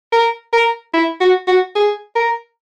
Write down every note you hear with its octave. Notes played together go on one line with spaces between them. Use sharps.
A#4
A#4
E4
F#4
F#4
G#4
A#4